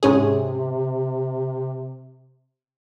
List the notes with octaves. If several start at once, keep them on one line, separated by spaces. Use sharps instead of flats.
G#2 C3 C#4 G#4